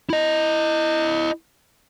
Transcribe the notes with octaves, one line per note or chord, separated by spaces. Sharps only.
E4 D#5